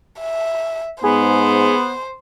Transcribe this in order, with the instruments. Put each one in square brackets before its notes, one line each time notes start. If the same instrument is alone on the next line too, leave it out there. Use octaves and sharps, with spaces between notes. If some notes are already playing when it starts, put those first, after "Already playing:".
[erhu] E5
[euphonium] G#2 [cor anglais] B3 [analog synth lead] G#4 [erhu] C5